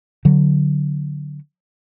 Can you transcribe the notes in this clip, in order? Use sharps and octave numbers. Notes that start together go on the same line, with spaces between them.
D3 F#3